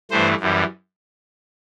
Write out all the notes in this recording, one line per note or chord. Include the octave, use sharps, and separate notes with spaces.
G2 E3 A3 C5
F#2 E3 G3